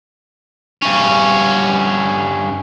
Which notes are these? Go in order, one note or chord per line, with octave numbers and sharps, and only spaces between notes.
G2 C#4